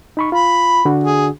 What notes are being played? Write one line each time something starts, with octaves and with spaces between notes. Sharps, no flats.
D#4 B5 C#6
F4 B5
D3 D4 F#4
G#4